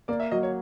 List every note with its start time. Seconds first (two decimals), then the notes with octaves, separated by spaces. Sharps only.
0.08 A#3 D5
0.20 E5
0.31 F#3 D#5
0.43 C#5